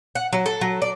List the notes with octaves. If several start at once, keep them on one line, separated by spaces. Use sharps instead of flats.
F#5
F#3
A4
F#3
D5